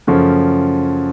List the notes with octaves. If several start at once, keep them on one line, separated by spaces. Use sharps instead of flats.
F#2 C#3 F3 A3 C#4